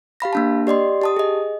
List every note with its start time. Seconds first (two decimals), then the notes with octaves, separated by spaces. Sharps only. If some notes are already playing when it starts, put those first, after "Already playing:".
0.20 G4 F5 B5 A#6
0.33 A#3 D4 A5
0.67 G4 D5 D#5 C6
1.02 G4 A5 D#6
1.17 G#4 D#5